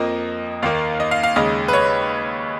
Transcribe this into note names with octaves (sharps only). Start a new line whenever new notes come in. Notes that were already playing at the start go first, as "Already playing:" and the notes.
Already playing: F2 F3 A#3 D#5
D#2 D#3 A#3 F5
D#5
F5
F5
D#2 C#3 G#3 D#5
B4
C#5